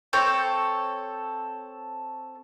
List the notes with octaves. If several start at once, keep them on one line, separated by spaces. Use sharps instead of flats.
C4 A4 C#5 G6